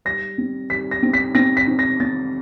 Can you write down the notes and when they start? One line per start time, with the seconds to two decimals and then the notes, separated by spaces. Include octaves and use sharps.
0.05 G3 A#6
0.38 C4
0.70 G3 B6
0.91 A#6
1.03 C4
1.13 B6
1.35 C4 A#6
1.57 B6
1.68 C4
1.79 A#6
2.00 C4 A6